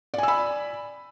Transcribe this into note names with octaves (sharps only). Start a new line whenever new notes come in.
D5 G#5 B5 E6